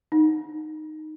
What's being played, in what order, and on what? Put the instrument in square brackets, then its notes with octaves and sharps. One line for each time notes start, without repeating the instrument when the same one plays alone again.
[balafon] D#4